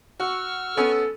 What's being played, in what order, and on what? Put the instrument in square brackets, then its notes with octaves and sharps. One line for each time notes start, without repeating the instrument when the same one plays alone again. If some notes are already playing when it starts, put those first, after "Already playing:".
[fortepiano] F#4 [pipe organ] C#6 E6 F6
[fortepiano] B3 C#4 [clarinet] A4